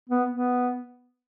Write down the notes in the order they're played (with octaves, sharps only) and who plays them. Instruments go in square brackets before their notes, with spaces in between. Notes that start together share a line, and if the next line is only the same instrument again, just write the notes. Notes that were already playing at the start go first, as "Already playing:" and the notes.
[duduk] B3
B3